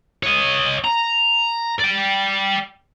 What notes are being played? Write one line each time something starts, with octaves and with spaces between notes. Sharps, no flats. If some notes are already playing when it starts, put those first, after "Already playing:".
C#5 D#5
A#5
D5 G5